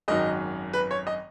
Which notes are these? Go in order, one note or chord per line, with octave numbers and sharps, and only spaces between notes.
G#1 F#2 D#3 F#3 D#5
B4
C#5
D#5